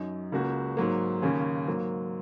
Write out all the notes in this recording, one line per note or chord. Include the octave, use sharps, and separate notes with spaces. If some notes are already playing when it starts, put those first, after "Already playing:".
Already playing: F#2 F#3 D#4
C#2 C#3 A#3 F#4
G#2 F#3 A#3
D#2 C#3 A#3 C#4 G#4
G#2 F#3 A#3